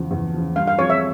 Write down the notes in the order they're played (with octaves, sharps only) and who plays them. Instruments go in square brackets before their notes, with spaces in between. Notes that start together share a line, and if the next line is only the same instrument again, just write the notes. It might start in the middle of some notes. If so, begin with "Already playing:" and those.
Already playing: [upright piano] E2 C#3 F3
E2
C#3 F3
[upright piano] G2 [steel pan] F5
[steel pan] F5
[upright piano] F3 C4 F4 G#4 [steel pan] C#5
[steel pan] E5